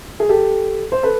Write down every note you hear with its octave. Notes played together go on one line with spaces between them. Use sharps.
G#4
G4 A4
C5
A4 B4